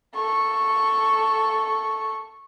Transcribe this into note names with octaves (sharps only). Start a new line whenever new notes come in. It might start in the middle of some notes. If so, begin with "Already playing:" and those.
A4 C#6